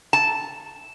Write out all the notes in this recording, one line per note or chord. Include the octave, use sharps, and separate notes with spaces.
A5